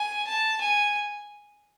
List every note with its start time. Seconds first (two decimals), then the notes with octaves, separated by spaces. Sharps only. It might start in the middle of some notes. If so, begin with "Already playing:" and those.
Already playing: G#5
0.27 A5
0.61 G#5